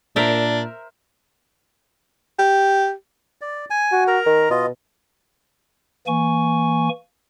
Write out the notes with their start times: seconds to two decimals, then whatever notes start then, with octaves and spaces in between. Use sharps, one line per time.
0.16 A#2 D4 A#4 C5 E5
2.39 G4
3.41 D5
3.70 G#5
3.92 F#4
4.07 A#4 A#5
4.26 D#3
4.50 B2 F4 D#5
6.07 E3 A#3 G#5 C#6